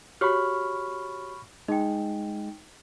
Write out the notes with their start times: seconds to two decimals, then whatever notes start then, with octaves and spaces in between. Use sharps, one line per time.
0.21 F#4 G4 C#5 B5 C#6 F6
1.68 G#3 D#4 G5